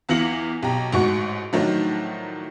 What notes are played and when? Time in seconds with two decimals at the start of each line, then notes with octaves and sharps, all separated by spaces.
0.09 E2 E3 F4 A#6 C#7 F#7
0.63 B1 G4 A#5
0.93 A1 G#2 F#4 C#6 C#7
1.53 A2 D#3 F3 F#3 D4 D#4